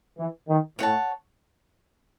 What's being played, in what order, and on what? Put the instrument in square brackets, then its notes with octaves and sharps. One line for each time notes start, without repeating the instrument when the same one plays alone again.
[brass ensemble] E3
D#3
[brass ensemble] A2 [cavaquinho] C#5 F#5 A5